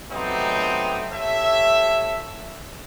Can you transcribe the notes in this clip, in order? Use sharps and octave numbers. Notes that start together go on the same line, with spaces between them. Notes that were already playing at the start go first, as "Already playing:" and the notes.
F#3 A3 B3 C4 D#4 G4
G4 A4 C#5 E5